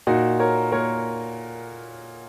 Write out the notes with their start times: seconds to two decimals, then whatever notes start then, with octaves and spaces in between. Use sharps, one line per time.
0.07 A#2 D#4 F#4
0.39 A#4 C#5
0.72 A#2 A#4 C#5